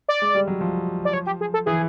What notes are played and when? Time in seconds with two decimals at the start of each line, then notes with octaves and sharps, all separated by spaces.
0.09 D5
0.22 G#3
0.35 G3
0.47 F#3
0.61 F3
1.05 D5
1.13 C#5
1.26 G4
1.41 G#4
1.54 A4
1.66 E3 G#4